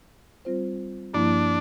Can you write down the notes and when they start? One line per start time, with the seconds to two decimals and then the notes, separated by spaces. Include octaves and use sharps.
0.45 G3 C4 F4 C5
1.14 G2 F3 A#3 D4 E4